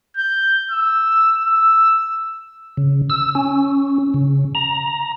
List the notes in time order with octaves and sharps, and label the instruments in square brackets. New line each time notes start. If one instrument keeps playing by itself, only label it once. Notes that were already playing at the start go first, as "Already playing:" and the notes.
[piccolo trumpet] G6
E6
E6
[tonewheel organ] C#3
E6
C#4
C#3
A#5